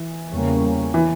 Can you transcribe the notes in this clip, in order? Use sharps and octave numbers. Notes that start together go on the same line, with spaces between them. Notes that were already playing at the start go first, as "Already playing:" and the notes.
Already playing: E3
E2 C#3 G3 A#3 C#4
E3